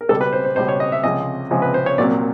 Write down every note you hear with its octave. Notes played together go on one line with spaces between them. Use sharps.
A#4
C#2 B2 G3 A4
B4
C5
C5
C#2 B2 G3 C5
C#5
D#5
E5
C#2 C3 F3 G#3 D#5
C#2 C3 F3 G#3
B4
C5
C#5
C2 A#2 F#3 D5